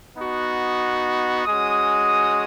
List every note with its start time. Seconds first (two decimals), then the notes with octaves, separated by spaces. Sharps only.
0.16 B3 D#4 F#4
1.45 G#3 C#4 F#4 D#6